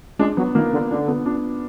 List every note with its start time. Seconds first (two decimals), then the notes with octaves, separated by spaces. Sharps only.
0.19 G#3 D4
0.37 F#3 B3
0.55 D#3 A#3
0.73 D3
0.90 D3 D4
1.08 B3
1.26 D4